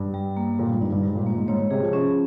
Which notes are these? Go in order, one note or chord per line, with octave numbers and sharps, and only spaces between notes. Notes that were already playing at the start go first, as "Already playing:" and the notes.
Already playing: G2
G3
A#3
A#2 G3
G#2
G2 D#4
G2
G#2 G3
A#2
G#2 A#3
G#2
G#2 C#5
G#2
C3 G#4
F3
C#4